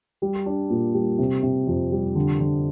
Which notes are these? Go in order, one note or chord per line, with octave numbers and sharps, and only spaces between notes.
G3
D4
A#2
G3
C3
C3
F2
G3
D3
D3